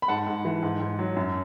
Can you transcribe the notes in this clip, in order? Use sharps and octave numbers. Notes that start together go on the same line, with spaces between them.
B5
G#2 F#5 A5
G#2
E3
G#2
G#2
F#3
F#2